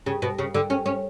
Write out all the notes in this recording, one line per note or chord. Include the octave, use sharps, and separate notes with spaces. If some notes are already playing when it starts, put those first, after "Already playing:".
C#3
B2
C#3
D3
C#4
C#4